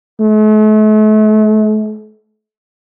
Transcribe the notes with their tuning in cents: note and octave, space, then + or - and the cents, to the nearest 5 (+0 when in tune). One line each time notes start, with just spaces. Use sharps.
A3 -40